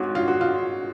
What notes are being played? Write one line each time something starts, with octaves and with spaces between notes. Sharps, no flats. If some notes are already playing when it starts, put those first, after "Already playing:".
Already playing: G#1 G#2 F#4 C#5
F4
F#4
F4